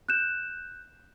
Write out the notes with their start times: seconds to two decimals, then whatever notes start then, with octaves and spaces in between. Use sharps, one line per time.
0.09 F#6 G6 E7